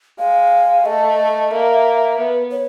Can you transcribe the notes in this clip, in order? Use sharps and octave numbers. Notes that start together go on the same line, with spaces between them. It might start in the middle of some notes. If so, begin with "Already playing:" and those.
G#3 F5
A3 D#5
A#3 E5
B3
C#5